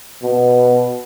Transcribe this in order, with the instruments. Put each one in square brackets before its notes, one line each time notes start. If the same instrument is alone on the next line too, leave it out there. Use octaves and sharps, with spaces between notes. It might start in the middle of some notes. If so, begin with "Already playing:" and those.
[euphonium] B2